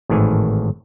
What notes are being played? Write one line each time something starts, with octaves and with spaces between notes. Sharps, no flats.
G#1 A2 D#3 E3 G#5